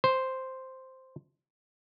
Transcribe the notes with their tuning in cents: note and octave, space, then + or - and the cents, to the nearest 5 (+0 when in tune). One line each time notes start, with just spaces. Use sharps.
C5 +0